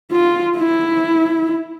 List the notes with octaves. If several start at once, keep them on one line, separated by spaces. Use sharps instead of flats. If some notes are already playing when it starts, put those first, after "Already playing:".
F4
E4